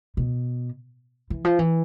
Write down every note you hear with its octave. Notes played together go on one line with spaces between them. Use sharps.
B2
E3
F3
E3